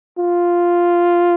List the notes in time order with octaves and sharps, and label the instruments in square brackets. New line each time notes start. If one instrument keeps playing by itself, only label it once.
[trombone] F4